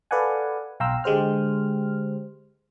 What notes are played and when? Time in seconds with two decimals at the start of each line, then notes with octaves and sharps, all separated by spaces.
0.11 A4 B4 D5 F5 F#5 G#5
0.80 B1 F5 G5 A#5 C6 E6
1.04 D3 G#3 G4 C5 F6